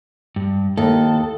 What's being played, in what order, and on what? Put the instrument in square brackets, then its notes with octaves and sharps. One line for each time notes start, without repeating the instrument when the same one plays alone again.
[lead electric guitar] G2
[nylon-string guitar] D#2 [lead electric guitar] A4